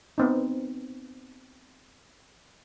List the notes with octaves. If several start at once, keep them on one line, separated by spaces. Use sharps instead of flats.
B3 C4 D#4